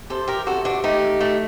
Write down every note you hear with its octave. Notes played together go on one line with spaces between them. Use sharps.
C3 A4 C5
G4 A#4
C3 F#4 A4
D4 F#4
A3 D#4 G4
A3